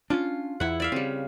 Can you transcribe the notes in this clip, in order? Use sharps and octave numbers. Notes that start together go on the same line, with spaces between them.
C#4 D4 F4
E2 E4 F#5
D5 E5 F5
C#3 G3 C4